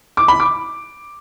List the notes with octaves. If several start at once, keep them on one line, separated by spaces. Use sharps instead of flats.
D6
B5
D6